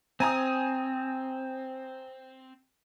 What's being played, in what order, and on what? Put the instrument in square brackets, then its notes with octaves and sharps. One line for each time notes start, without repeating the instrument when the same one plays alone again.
[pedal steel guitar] C4 [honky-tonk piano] G#5 A#5 D#6